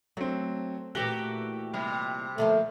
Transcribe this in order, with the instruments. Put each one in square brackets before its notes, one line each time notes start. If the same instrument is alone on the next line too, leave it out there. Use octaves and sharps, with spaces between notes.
[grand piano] F#3 C4 [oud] A3
[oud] A#2 E3 A3 [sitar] F#4 G4 [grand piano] F#7 G7
[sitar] C3 G3
[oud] D3 F3 A#3 [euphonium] A3